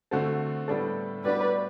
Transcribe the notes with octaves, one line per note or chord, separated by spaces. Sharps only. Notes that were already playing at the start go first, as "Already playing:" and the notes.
D3 A3 C4 F#4 A4
A2 G3 B3 D4 A4
A2 G3 B3 D4 F#4 B4 D5